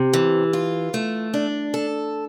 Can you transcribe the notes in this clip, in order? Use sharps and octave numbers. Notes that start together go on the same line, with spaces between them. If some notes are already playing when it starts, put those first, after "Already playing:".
Already playing: C3
E3
F4
A3
D4
A4